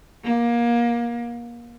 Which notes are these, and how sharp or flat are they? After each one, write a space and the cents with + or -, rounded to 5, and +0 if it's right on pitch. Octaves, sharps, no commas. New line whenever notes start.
A#3 +25